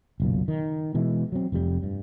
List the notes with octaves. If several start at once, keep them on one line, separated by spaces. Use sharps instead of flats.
F#1 B1 A#2
D#3
B2 E3 G#3
F#3 C4
F1 F2 A2 G3
G2